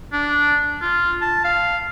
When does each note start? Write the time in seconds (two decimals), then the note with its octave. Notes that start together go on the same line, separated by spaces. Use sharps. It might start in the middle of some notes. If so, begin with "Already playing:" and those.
0.12 D4
0.81 F4
1.21 A5
1.44 F5